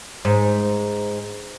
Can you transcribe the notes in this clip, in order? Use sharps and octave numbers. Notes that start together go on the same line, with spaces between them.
G#2